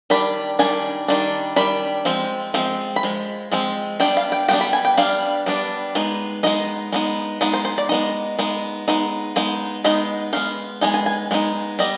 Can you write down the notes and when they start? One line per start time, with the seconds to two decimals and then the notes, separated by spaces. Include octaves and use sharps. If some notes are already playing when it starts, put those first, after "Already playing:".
0.10 D#3 G3 D4 B5
0.59 D#3 G3 D4 G#5
1.08 D#3 G3 D4
1.56 D#3 G3 D4 B5
2.05 F3 G#3 C4
2.54 F3 G#3 C4
2.96 B5
3.03 F3 G#3
3.51 F3 G#3 C4
4.00 G3 B3 D4 G5
4.17 F5
4.32 G5
4.48 G3 B3 D4 G5
4.61 B5
4.73 G#5
4.85 G5
4.97 G3 B3 D4 F5
5.46 G3 B3 D4
5.95 G#3 B3 D#4
6.43 G#3 B3 D#4 D#5
6.92 G#3 B3 D#4
7.41 G#3 B3 D#4
7.53 C5
7.65 C5
7.78 D5
7.89 G#3 B3 D#4 D#5
8.39 G#3 B3 D#4
8.88 G#3 B3 D#4
9.36 G#3 B3 D#4
9.84 G#3 B3 D#4 D#5
10.33 G#3 B3 D#4 F5
10.81 G#3 B3 D#4 G#5
10.94 G#5
11.06 G#5
11.31 G#3 B3 D#4
11.79 G3 B3 D#5